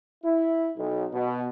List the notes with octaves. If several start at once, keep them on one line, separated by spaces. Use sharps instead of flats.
E4
B1
B2